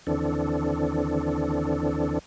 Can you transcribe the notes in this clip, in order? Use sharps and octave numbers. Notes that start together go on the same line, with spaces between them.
D#2 D3 E3 C4 D4 A4